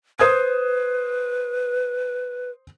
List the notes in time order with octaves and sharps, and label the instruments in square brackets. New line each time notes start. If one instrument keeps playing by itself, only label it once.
[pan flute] B4 [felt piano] C5 D#6 G#6